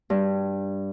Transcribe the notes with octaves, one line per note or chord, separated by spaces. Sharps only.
G2